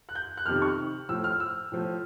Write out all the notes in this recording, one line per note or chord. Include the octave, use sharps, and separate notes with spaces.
F#6
G6
F#6
F2 C3 D#3 F6
C#6
A2 F3 E6
F6
E6
A2 F3